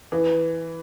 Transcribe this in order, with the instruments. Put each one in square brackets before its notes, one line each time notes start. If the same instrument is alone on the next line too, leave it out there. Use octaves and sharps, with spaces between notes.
[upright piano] E3 [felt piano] B4